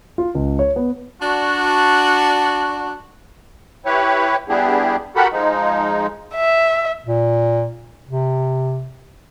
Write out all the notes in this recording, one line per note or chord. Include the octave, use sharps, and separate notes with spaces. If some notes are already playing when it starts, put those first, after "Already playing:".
F4
C#2
C#5
B3
D4 F#4
E4 G4 B4 C#5
G3 B3 D4 E4 G4 G#4
F#4 G4 A4 A#4 F#5 B5
F3 G#3 D#4
E5
A#2
C3